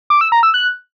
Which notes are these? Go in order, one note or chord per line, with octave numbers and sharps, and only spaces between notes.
D6
E6
A#5
E6
F#6